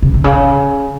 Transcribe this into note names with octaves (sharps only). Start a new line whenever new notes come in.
C3
C3
C#3